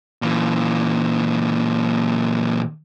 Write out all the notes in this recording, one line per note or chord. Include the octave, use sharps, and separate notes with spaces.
A#2 E3